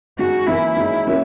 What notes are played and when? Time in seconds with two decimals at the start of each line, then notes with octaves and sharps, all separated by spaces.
0.19 F#2 D#3 G#3 F#4
0.47 F#2 E3 A#3 E4
0.76 F#2 D#3 G#3 C#4
1.07 F#3 A#3 C#4 E4